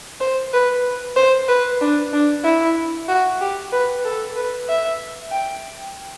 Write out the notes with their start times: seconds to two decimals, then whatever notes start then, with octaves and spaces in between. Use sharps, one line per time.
0.20 C5
0.53 B4
1.16 C5
1.48 B4
1.81 D4
2.13 D4
2.44 E4
3.08 F#4
3.41 G4
3.72 B4
4.05 A4
4.36 B4
4.68 E5
5.32 G5